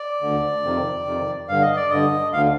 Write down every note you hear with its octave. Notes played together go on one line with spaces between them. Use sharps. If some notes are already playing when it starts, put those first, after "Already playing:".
Already playing: D5
D2 D3
F2 C3 D#3
F2 C3 D#3
G2 D3 F5
D#5
D5
G2 D3 D#5
D2 D3 F5